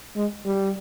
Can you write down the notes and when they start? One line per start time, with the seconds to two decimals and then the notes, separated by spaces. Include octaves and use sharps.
0.16 G#3
0.45 G3